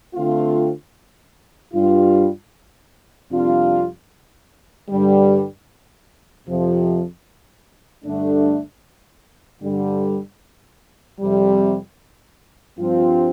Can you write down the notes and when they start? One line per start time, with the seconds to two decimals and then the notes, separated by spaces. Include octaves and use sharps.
0.15 D3 A3 C4 F4
1.73 G2 G3 F4
3.31 F2 C3 G3 D4 F4
4.89 G2 D3 G3
6.47 F2 C3 F3
8.05 G2 D3 A3 D4
9.63 G2 D3 G3
11.21 F2 C3 G3
12.79 G2 F3 C4 F4